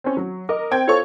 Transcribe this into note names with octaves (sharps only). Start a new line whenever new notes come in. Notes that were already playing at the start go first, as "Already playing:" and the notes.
C4 C#4
F#3
A#4 D#5 D6
C4 G5 G#6
F4 A4 C5 C#5 C#6